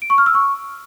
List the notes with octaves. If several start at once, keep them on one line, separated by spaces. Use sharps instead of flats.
D7
C#6
F6
E6
C#6